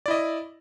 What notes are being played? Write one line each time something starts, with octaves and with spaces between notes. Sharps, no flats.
E4 D5 D#5